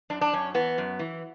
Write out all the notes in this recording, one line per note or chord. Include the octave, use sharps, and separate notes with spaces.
F#2 D4
D4
F#2 C#4
E3 B3
F#2
E3